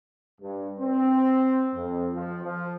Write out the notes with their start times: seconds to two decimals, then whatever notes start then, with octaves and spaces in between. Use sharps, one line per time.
0.41 G2
0.79 C4
1.75 F2
2.15 F3
2.43 F3